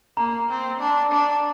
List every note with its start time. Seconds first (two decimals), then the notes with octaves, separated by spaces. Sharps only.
0.17 A#3 A#5
0.49 C4
0.80 D4
1.12 D4